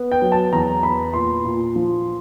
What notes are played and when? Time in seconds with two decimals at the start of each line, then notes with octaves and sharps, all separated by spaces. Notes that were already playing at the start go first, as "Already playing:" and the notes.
Already playing: B3
0.12 G5
0.22 F#3
0.32 A5
0.53 E2 A#5
0.83 B3 B5
1.14 A#2 C6
1.45 A#2
1.76 F3